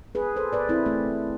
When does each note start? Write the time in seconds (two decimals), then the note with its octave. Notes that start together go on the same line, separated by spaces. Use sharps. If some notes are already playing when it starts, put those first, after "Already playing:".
0.15 G#4 B4
0.36 A4 C5
0.53 B4 D5
0.69 C4 E4
0.86 A3 C4